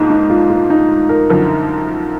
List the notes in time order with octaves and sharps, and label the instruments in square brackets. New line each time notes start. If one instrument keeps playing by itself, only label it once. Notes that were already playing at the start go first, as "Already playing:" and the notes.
Already playing: [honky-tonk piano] G#2 F3 A#3 D4 [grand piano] D#4
[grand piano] D#4
F4
F4
D#4
A#4
[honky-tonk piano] F#2 D3 F3